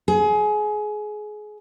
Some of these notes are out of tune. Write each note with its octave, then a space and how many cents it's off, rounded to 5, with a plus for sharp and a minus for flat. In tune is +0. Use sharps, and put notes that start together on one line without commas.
G#4 +25